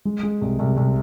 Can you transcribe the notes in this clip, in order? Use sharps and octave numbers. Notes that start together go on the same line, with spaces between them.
G#3
G#3
C2
C2
C2